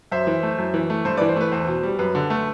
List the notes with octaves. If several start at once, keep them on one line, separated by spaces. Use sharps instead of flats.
F#2 C5 E5
E3
A3
F#2
E3
A3
G2 C5
B4 D5
E3
C5
A3 B4
E2 C5
B2
G3
F#2 B4
D3
A3